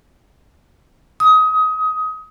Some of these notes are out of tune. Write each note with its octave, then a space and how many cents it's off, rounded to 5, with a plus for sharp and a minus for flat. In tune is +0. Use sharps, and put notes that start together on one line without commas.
D#6 +25